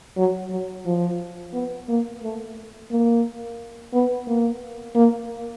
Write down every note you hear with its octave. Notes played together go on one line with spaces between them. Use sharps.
F#3
F#3
F3
B3
A#3
A3
A#3
B3
A#3
A#3